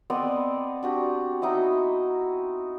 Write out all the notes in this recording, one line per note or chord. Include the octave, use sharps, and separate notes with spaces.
B3 C4 D5 D#5
D4 F#4 G4
D#4 E4 F#4 D#5